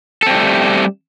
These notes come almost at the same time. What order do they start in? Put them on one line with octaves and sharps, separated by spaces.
A4 C4 G3 A3